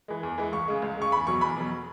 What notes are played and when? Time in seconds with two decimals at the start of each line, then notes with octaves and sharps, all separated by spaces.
0.08 E3 G#3
0.23 E2
0.38 E3 G#3
0.52 C#2 C#6
0.68 C#3 G#3
0.82 C#2
0.97 C#3 G#3 C#6
1.12 E2 B5
1.27 B2 F#3 C#6
1.41 E2 B5
1.57 B2 F#3